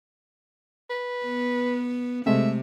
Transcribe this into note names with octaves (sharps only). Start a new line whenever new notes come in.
B4
B3
C3 G#3 A3 C4 E5